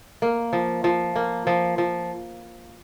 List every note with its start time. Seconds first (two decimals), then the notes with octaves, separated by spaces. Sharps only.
0.22 A#3
0.53 F3
0.84 F3
1.16 A#3
1.47 F3
1.78 F3